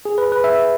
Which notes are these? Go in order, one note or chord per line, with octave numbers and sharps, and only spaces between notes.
G#4
B4
B4
E5